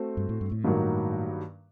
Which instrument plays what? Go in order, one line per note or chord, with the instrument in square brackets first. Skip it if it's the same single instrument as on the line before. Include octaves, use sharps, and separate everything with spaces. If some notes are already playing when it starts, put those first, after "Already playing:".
Already playing: [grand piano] A3 C4 F#4 C5
[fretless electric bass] G2
A2
G2
A2
[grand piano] G2 D#3 F#3 A#3